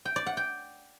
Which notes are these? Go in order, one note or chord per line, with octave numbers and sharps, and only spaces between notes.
G5
D5
F#5
G5